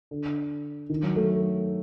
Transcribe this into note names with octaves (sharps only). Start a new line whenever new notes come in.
D3
D#3
F#3
A3